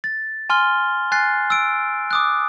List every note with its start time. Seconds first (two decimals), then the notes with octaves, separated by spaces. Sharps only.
0.04 A6
0.50 G#5 C6 F6 G7
1.12 G#5 F#6 A6 C7
1.50 E6 D7
2.11 D6 D#6 F#6